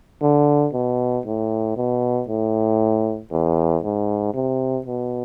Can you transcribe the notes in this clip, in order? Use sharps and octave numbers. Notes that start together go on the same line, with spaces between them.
D3
B2
A2
B2
A2
E2
G#2
C3
B2